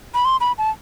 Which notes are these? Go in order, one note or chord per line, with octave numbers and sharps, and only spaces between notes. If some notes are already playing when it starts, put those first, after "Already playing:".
B5
C6
B5
A5